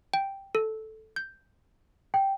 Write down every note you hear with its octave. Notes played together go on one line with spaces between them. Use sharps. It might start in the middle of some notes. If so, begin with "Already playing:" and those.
G5
A4
G6
G5